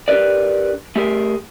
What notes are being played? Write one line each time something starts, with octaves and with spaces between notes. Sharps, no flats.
D4 G4 A#4 B4 D5
A3 G4 G#4 A#4